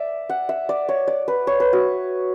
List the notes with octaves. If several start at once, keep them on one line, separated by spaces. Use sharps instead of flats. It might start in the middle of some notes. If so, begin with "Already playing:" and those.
Already playing: D5 E5
F#5
E5
D5
C#5
D5
B4
C#5
B4
F#4